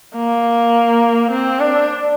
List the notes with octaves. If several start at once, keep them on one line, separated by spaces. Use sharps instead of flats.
A#3
C4
D4